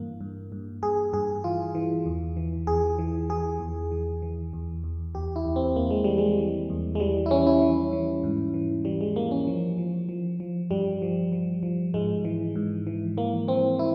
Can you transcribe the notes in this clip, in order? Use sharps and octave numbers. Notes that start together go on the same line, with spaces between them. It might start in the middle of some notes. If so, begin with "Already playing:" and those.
Already playing: G2 E3 A#3
G2
G2
G2 G#4
G2 G#4
E3 F4
E3
E2
E3
E2 G#4
E3
E3 G#4
E2
E3
E3
E2
E2
E2 G4
E4
E2
C4
E2 A#3
G#3
E3 G3
G#3
E3
E2
G#3
E3 G3
E4
E3 C#4
E4
E3
E3
G#2
E3
E3 G3
G#3
E3 A#3
C#4
F3
F3
F3
F3
G2 G3
F3
F3
F3
G#2 G#3
E3
G#2
E3
E3 A#3
E3 C4
E3 E4